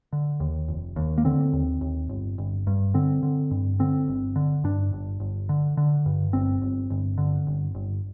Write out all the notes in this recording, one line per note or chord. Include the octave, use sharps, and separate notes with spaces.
D3
D#2
F1
D#2
A#3
D3 C4
D#2
D#2
G1
G1
G2
D3 C4
D3
G2
D3 C4
G1
D3
G2 D4
G1
G1
D3
D3
G2
G1 C4
G1
G1
D3
G1
G1